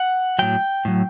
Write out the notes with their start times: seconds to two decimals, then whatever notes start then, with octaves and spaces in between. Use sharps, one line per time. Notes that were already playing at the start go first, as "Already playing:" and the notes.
Already playing: F#5
0.39 A2 F#3 G5
0.85 A2 F#3